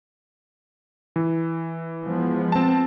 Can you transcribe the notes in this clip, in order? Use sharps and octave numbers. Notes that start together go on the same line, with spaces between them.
E3
F3 G#3 B3
C4 A5